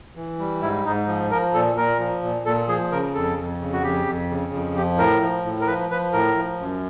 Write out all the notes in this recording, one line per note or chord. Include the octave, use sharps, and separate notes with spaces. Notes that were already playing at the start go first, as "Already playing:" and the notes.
E3
G3
G#2 E4
G#2 D#4
F3
F3 A#4
A#2 A4
A#2 A#4
F3
A#2
A#2 A4
F3 G#4
C#3 A#4
F2 A4
F2
C#3
F#4
F2 G4
F2
C#3
F2
F3 G4
A2 A#4
F3
A2
A#4
F3 B4
F3 B4
A2 A#4
F3
F#2